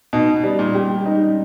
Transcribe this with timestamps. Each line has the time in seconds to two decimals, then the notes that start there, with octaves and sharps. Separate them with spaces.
0.13 B2 D#4
0.44 G3
0.59 A#2
0.74 G4
1.06 D#4